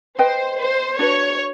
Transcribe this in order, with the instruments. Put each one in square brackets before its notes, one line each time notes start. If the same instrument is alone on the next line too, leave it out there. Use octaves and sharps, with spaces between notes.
[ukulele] B4 D#5 G5 [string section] C5
[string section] C5
[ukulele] D4 F#4 B4 [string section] C#5